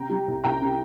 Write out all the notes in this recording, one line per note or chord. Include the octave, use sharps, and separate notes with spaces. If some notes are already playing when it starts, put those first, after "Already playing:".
Already playing: C3 G5 A#5
G3
C2
C2 G5 A#5
C3